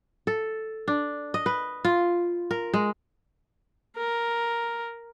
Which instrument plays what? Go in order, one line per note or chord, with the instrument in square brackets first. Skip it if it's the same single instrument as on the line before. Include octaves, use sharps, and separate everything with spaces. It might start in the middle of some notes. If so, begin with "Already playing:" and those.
[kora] A4
D4
D#5
B4
F4
A#4
G#3
[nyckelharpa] A#4